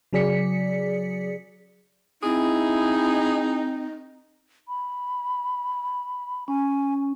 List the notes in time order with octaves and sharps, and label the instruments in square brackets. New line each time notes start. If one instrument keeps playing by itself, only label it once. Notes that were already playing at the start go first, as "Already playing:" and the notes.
[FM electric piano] C#3 F#3 G#4 D5 B6 C#7
[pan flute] C4 [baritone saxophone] D#4 [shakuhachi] E4 [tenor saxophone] G#4
[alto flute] B5
[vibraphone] C#4 [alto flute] G#5